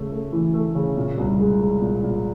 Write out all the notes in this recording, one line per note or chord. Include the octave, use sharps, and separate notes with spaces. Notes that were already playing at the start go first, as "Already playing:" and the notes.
Already playing: C#3 A3
A3
E3
A3
C#3
A#2
C2
G#3
G#3
A#2
A#2